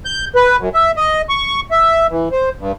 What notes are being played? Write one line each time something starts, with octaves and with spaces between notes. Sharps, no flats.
G6
B4
F#2
E5
D#5
C#6
E5
E3
C5
G2